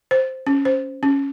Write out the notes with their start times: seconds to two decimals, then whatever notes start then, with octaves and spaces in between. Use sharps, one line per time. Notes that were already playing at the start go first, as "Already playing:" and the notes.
0.11 C5
0.47 C#4
0.65 C5
1.03 C#4